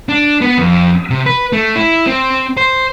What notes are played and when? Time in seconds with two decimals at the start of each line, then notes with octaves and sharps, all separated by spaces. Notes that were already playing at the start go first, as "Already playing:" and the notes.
0.09 D4
0.41 B3
0.58 F2
1.10 C3
1.26 B4
1.53 A3
1.75 E4
2.07 C4
2.57 C5